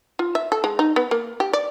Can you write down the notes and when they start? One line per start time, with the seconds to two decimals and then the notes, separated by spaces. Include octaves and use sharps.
0.19 F4
0.35 E5
0.52 A4
0.64 G#3
0.79 D#4
0.96 B3
1.11 A#3
1.40 G4
1.53 D5